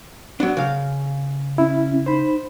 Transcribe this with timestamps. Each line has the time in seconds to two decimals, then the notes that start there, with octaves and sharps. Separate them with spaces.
0.40 F#3 B3 D4
0.57 C#3 F5
1.58 C#4 E4
2.06 D#4 C5 B5